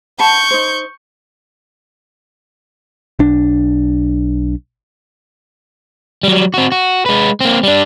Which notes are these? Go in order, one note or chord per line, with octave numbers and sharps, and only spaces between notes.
F#5 A5 B5 C#6 G6
D#4 C5
B1 D4
F#3 G3
C4 F#4
F#4
G#3 B4
A#3 C4
G3 D4